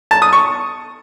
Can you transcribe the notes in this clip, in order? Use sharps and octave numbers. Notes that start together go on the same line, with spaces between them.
A5
D#6
C#6